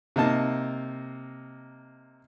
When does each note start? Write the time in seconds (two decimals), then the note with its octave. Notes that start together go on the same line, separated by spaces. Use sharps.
0.16 C3 A#3 D#4 A5